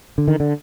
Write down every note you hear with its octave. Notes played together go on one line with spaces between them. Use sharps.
D3
D#3
D3